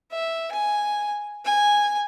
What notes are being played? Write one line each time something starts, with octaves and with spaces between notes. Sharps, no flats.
E5
G#5
G#5